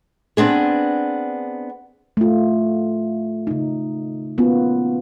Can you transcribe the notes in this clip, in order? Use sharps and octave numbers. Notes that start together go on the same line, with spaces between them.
B3 C4 D4 G#4
A3 F4
C#3 D#4
A#3 B3 C#4 F4 F#4